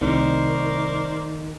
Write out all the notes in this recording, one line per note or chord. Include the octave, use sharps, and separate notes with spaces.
C2 A2 D#3 A#4 C5 D5